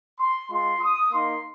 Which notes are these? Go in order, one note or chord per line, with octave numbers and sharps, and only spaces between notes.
C6
G#3 F4 C6
D#6
A#3 D#4 C6